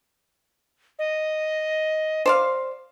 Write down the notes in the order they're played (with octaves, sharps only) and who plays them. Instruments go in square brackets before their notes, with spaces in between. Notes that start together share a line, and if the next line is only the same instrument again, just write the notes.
[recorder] D#5
[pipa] C5 D5 F5